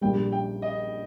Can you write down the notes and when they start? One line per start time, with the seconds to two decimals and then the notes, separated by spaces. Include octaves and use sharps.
0.01 A#1 A#2 G3 G5
0.32 G5
0.62 D#5